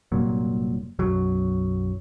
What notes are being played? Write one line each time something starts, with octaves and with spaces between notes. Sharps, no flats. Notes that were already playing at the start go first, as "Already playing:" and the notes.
F1 G2 A#2 F#3
B1 F#2 F#3